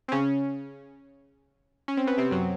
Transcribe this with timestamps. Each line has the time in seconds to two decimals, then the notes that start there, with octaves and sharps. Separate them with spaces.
0.08 C4
0.12 C#3 C#4
1.88 C#4
1.97 C4
2.07 B3
2.17 C3 C4
2.31 F#2 F#3